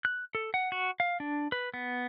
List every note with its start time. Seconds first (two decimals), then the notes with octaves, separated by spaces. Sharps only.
0.05 F#6
0.35 A4
0.54 F#5
0.72 F#4
1.00 F5
1.20 D4
1.52 B4
1.74 B3